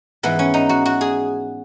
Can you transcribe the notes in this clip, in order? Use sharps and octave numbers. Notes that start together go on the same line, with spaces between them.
G#2 E3 B3
C#4
D#4
F#4
F#4
G#4